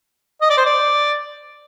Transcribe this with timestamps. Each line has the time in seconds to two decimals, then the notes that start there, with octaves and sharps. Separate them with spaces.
0.42 D#5
0.50 D5
0.58 C5
0.66 D5